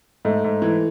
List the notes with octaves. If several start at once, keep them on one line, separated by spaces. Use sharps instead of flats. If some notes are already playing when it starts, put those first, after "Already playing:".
G#2 A3
G#2
E3